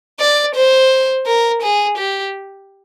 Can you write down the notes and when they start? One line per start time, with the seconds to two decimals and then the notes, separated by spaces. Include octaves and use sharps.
0.20 D5
0.55 C5
1.26 A#4
1.62 G#4
1.98 G4